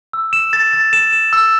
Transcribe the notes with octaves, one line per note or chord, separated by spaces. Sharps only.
E6
E7
A6
A6
E7
E7
E6